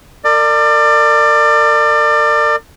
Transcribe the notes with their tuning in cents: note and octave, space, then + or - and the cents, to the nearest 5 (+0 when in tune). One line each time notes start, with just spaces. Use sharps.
A#4 -40 D5 +25